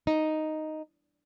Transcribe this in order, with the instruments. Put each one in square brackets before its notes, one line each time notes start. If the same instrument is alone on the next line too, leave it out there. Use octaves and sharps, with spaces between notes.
[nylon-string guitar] D#4